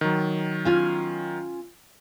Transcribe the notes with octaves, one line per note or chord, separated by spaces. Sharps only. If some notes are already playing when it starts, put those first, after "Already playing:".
D#3 F#3
C#4 F4 G#5